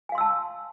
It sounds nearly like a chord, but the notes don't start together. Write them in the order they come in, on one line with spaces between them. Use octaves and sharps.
G#5 F5 C6 E6 A5